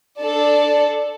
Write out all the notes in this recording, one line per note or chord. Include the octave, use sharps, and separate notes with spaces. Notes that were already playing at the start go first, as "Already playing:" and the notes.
D4 A4 D5 A5